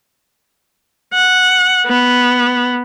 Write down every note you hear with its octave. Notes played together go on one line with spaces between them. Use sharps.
F#5
B3